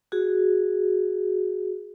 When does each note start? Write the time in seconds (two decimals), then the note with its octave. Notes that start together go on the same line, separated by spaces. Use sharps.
0.12 F#4 G#4